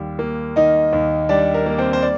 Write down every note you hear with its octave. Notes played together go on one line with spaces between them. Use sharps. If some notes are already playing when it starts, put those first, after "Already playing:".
Already playing: D#2 D#3 G3
A#3
D#3 D#4 D#5
D#2
G3 D4 D5
A#4
A#3
C4 C5
C5
D5